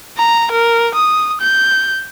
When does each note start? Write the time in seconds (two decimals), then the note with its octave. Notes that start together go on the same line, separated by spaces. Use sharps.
0.18 A#5
0.52 A#4
0.95 D#6
1.41 G6